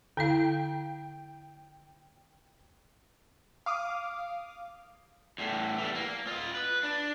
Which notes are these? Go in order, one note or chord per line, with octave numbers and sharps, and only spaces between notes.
D3 E4 F5 G5
F5 D6 D#6
E2 A2
E3 G3
A#3
F4 D#5
B4
D4